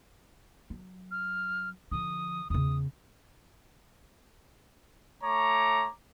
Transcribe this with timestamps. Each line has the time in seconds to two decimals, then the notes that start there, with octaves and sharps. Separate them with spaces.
0.70 F#3
1.11 F6
1.92 D3 F3 D#6
2.50 E2 C#3 D#6
5.24 A3 C#5 A#5 D6